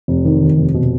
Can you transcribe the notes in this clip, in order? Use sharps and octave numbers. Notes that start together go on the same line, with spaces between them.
F1
D#3
D#2
F1
B2